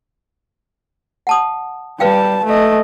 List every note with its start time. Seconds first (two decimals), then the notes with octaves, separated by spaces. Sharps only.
1.27 F#5 A5 D#6
2.00 G3 B4 F5 G5 A5
2.45 A3 D#5